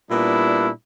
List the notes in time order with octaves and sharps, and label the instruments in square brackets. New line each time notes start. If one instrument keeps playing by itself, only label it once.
[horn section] A#2 G3 B3 D4 E4